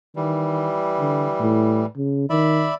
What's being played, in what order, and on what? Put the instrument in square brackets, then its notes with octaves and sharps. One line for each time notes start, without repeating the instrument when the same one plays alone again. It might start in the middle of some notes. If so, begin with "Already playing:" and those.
[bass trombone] D#3 [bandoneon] E3 G3
[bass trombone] D3
A2
C#3
[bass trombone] D#3 [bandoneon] D5 E5 B5